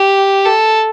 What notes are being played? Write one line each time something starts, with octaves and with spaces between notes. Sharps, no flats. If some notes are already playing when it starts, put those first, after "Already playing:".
Already playing: G4
A4